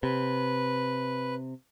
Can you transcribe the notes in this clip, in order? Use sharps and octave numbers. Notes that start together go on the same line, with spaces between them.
C3 B4